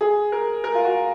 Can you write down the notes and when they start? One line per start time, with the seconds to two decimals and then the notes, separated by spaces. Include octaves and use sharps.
0.01 G#4
0.32 A#4
0.64 A#4
0.75 F4
0.85 F#4